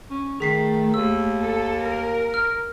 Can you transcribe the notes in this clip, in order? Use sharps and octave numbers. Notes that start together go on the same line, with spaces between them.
C#4
D#3 A3 G#4 B6 C7
D#2 E6
A4
A#4
F6